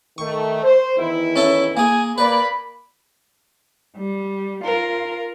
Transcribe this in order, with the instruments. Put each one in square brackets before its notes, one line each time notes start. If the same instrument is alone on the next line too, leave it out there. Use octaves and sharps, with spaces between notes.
[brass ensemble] D#3 A3 [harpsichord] C#6
[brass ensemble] C5
E2 D#3 E4
[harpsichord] C#4 A4 E5
[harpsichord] A#3 G#4 [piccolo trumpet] G#5
[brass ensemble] A#3 D5 [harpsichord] B4 [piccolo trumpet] B5
[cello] G3
[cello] F4 [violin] A#4